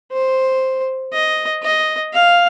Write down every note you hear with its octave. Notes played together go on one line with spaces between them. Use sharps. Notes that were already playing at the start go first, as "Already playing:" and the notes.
C5
D#5
D#5
F5